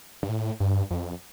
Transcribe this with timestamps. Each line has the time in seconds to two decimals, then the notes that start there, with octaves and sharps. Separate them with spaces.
0.23 G2
0.29 A2
0.60 G2
0.91 F2